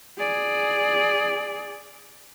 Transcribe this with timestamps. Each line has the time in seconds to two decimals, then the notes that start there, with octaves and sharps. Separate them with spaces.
0.18 G#4 D5